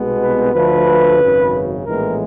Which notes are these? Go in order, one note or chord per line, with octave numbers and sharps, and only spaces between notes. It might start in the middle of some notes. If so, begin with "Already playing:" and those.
Already playing: C2 B2 G#3 B3
B4
D2 D3 F3 A3 B4
G#1 F#2 C#3
A#1 A2 E3 G#3 B3 A#4